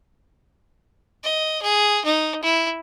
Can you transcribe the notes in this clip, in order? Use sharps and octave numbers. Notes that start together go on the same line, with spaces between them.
D#5
G#4
D#4
E4